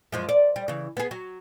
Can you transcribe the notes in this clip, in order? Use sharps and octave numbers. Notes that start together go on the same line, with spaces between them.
F#2 F3 G#3
D5
G3
C#3 E3
B3 G#4
F#3